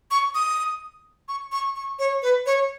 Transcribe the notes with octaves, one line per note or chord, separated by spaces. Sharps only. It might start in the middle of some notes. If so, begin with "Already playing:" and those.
C#6
D#6
C#6
C#6
C#6
C#5
B4
C#5